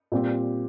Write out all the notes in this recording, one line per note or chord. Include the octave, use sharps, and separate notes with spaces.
A#2 G3 C4 G4